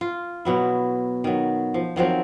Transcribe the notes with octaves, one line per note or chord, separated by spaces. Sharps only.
F4
B2 F#3 E4
D#3 F#3
F3
D#3 F3 F#3 C4